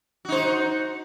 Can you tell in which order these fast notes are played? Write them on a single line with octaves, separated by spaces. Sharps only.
F#4 D#4 C5